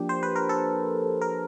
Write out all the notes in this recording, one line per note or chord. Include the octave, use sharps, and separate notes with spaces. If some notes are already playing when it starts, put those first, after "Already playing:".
Already playing: F3 A#3 D4 G4
C5
B4
A#4
A4
A#4